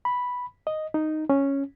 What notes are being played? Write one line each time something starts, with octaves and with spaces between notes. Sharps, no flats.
B5
D#5
D#4
C#4